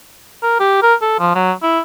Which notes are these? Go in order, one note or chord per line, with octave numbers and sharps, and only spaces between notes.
A#4
G4
A#4
A4
F3
F#3
E4